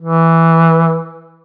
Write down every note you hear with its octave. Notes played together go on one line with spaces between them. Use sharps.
E3